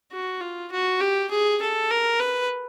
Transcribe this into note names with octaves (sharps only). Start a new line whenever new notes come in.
F#4
F4
F#4
G4
G#4
A4
A#4
B4